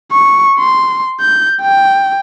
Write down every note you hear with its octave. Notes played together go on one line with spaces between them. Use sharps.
C#6
C6
G6
G5